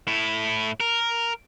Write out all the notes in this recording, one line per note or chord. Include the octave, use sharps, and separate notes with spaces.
A2 E4
A#4